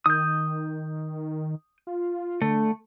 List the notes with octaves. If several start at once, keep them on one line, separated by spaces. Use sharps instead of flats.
D#3 D#6 G6
F4
D3 A3